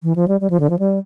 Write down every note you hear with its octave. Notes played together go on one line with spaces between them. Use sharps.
E3
F3
G3
G3
F3
D3
F3
G3